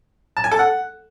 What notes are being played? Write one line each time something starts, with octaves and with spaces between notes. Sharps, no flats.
A5
G#5
A4
F#5